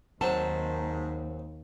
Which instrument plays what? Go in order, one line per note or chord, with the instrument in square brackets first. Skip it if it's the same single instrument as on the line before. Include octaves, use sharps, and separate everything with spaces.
[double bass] D#2 [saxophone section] G#2 D#3 [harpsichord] F#3 C4 [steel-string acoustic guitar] A5